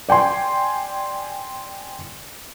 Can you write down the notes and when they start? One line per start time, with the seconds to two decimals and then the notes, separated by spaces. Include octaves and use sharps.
0.09 D5 G5 G#5 C6